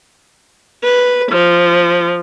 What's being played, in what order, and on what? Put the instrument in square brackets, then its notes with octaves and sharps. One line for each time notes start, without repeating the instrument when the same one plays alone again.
[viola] B4
F3